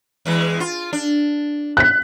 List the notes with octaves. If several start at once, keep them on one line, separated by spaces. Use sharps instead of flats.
E2 E3 G#3
F4
D4
F#6 B6